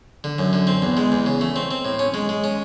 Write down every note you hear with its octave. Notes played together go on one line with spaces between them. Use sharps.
D3
F#2
D3
C4
E2
G#3
E2
C#3
A3
C4
C4
A2
C#4
G#3
G#3
C#4